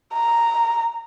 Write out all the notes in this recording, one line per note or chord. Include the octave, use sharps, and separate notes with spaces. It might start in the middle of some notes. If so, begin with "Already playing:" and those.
A#5